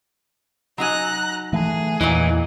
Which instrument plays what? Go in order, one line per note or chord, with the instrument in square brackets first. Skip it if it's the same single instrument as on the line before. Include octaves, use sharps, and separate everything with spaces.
[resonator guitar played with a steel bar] F#3 D#4 G#5 [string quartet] A#5 F#6
[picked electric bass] E3 A3 [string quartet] G#4
[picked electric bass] E2 [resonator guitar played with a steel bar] A#2 F#3 D#4 [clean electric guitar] E3